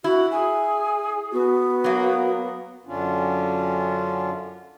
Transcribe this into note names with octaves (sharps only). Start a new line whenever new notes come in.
E4 F#4
G#4 G#5
B3 F#4
F#3 A#3
F#2 D3 C#4 D4 F4